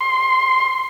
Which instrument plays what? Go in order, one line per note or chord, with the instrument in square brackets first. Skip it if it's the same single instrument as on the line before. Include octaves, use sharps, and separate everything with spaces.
[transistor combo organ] C6